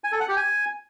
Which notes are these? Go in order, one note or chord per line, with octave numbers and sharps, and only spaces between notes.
G#5
A4
F#5
G4
G#5